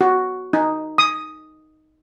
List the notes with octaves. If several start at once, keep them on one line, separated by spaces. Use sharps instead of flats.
F#4
D#4
D#6